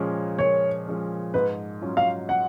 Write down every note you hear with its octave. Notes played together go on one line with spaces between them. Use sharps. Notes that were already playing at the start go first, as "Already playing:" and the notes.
Already playing: A#2 F3 G#3 C#4
A#2 C#5
F3 G#3 C#4
G#2 B4
F#3 C#4 F4
F5
F#5